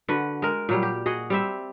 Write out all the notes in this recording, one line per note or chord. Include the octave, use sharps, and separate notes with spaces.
D3 F#4 B4
G#3 A#4
A#2 F#3 G3
G4
F#4 G#4 D#5
G3 C4 E5